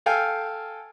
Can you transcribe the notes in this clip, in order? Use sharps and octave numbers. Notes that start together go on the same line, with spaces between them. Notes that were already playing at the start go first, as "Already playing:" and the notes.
A4 F5 G5 G#5